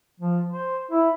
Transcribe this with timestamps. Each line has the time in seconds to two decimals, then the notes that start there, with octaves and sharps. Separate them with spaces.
0.20 F3
0.48 C5
0.91 E4